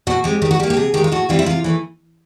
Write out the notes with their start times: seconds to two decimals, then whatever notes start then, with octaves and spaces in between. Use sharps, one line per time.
0.07 B2 F#4
0.24 G#3 C4 G4
0.42 D#3 G4
0.51 F#4
0.59 G3 G4
0.63 A#3
0.70 G4
0.77 C3 G#4
0.94 D#3 G#3 G4
1.04 F4
1.12 A2 F#4
1.29 E3 G3 C4 F4
1.39 E4
1.46 C3 F4
1.64 E3 A3